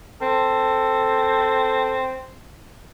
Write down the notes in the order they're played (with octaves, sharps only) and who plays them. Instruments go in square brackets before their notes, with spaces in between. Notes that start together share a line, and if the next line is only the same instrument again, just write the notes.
[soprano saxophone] C4 [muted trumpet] A4